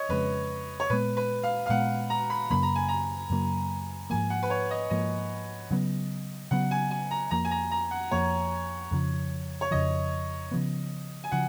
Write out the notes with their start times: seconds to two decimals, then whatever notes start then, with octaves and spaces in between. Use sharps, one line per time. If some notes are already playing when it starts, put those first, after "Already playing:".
Already playing: C#5 D#5
0.09 F2 C#3 G#3 B4
0.80 C#5
0.90 A#2 G#3 B3 B4
1.17 B4
1.44 F5
1.66 F5
1.69 A#2 G#3 B3 F#5
2.10 A#5
2.30 B5
2.50 F#2 C#3 F#3 A#3 B5
2.63 A#5
2.76 G#5
2.88 A#5
3.30 F#2 C#3 F#3 A#3
4.10 G#2 F3 A#3 G#5
4.30 F#5
4.43 B4
4.50 C#5
4.71 D#5
4.90 G#2 F3 A#3 D#5
5.71 C#3 F#3 B3
6.51 C#3 F#3 B3 F#5
6.71 G#5
6.91 G#5
7.11 A#5
7.31 F2 F3 A#3 A#5
7.45 G#5
7.51 A#5
7.71 A#5
7.91 F#5
8.11 F2 F3 A#3 C#5
8.91 F2 C#3 F3
9.61 C#5
9.71 F2 C#3 F3 D#5
10.51 C#3 F3 B3
11.24 G#5
11.32 C#3 F3 F#5